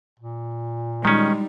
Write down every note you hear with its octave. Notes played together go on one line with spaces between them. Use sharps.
A#2
D#3 G3 G#3 C#4 D#4